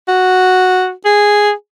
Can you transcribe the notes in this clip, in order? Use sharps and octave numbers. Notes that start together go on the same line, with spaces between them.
F#4
G#4